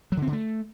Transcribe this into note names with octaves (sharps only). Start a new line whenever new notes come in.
F#3
D3
C4
D3
A3